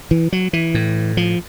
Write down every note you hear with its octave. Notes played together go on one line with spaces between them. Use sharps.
E3
F#3
E3
A2
F3